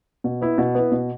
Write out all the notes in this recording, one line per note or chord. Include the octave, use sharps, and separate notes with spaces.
B2
B3 E4
B2
B3 E4
B2